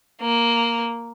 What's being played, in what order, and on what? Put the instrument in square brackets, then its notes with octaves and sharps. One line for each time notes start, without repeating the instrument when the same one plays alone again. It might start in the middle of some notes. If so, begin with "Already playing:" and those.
[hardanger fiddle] A#3